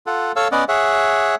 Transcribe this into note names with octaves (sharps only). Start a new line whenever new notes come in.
F4 A4 F#5
A4 C#5 F5 E6
B3 C#4 D5 D#5 F#5
G#4 C#5 E5 F#5